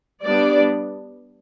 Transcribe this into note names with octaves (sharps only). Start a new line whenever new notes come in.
G3 B3 D4 D5